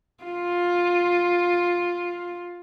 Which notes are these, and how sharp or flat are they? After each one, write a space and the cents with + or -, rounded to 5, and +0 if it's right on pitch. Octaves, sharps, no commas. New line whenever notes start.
F4 +10